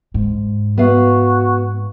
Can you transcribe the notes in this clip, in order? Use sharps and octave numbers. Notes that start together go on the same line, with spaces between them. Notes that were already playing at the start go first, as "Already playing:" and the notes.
G#2
B3 F#4 F5